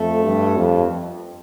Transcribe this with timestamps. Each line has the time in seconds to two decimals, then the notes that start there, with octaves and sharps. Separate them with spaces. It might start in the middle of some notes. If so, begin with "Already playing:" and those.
Already playing: F2 A3
0.25 G2
0.57 F2